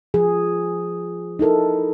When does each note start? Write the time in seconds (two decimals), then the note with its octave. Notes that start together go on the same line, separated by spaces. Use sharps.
0.14 F3 G#4
1.39 D#4 E4 A4 A#4